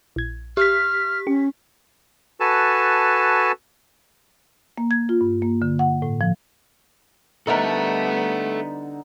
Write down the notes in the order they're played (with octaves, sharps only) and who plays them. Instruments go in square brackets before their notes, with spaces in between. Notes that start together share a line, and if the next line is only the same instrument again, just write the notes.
[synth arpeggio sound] A#1 G#6
[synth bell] G4 B6 [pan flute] F6
[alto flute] C#4 [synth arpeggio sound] G4
[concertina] F#4 A4 B4 G#5 A5
[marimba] A#3
G#6
F4
G2
A#3
D3
F#5
A2
F3
[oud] D3 A#4 [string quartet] G3 B3 [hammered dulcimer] D#4 F#5 [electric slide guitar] A4 E5